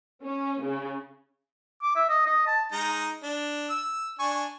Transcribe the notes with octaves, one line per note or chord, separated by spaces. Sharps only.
C#4
C#3
D6
E5
D#5
D#5
A5
G#3 D#4 A#5
D4
E6
D4 G#5 C#6